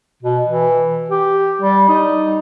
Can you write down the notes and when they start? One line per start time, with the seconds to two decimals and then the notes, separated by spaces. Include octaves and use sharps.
0.23 B2
0.46 E3
1.10 G4
1.61 G3
1.89 D#4